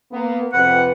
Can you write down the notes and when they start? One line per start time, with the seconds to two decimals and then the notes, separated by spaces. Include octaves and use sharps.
0.12 A#3 B3
0.53 F2 C3 B4 F#5